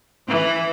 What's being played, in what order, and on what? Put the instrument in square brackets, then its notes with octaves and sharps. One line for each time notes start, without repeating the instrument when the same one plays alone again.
[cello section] E3